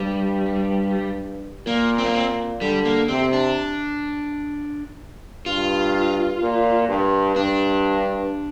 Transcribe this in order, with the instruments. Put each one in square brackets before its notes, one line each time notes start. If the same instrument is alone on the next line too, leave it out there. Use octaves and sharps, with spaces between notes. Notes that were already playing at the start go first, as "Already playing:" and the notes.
Already playing: [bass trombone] G2 [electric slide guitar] G3
[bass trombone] A#2 [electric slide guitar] A#3
[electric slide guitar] C4
A#3
C4
[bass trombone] D3 [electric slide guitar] G3
[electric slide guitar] A#3
[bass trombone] C3 [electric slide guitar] C4
[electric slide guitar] D4
[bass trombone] G2 [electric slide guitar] F4
[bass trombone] A#2
G2
[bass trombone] G2 [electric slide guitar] D4